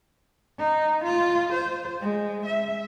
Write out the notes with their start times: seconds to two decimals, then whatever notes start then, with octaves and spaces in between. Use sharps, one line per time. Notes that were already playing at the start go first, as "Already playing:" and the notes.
0.59 D#4
1.05 F4
1.54 C5
2.01 G#3
2.46 E5